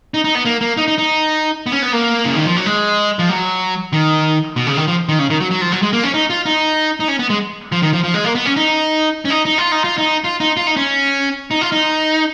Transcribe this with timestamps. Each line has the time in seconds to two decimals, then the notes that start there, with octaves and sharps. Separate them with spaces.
0.14 D#4
0.24 D#4
0.35 B3
0.45 A#3
0.61 A#3
0.77 D#4
0.88 D#4
0.98 D#4
1.66 B3
1.72 C#4
1.82 B3
1.93 A#3
2.26 C#3
2.36 D#3
2.45 F3
2.56 F#3
2.66 G#3
3.19 F3
3.29 F#3
3.93 D#3
4.56 B2
4.67 C#3
4.77 D#3
4.88 F3
5.09 D#3
5.19 C#3
5.30 D#3
5.40 F#3
5.51 F#3
5.61 F3
5.72 F#3
5.82 G#3
5.93 A#3
6.03 C#4
6.14 D#4
6.30 F4
6.46 D#4
7.00 D#4
7.08 C#4
7.19 B3
7.30 G#3
7.72 F3
7.82 D#3
7.93 F3
8.04 F3
8.14 G#3
8.24 A#3
8.35 B3
8.45 C#4
8.56 D#4
9.25 C#4
9.30 D#4
9.45 D#4
9.58 F4
9.72 D#4
9.84 F4
9.98 D#4
10.24 F4
10.40 D#4
10.57 F4
10.67 D#4
10.77 C#4
11.51 D#4
11.61 F4
11.72 D#4